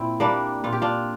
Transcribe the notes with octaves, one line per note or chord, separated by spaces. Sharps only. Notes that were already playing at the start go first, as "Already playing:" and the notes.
Already playing: A#2 C4 E4
G3 A#3 D4
A#2 F4
G4
D4 F4